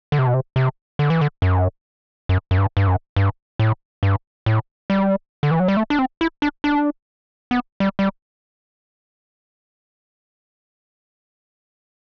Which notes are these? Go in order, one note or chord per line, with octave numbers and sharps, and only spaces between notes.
D3
C3
B2
C3
C3
D3
E3
D3
F#2
F#2
F#2
G2
G2
F#2
G2
A2
G2
A2
G3
D3
E3
F#3
G3
A3
D4
C4
E4
D4
D4
B3
G3
G3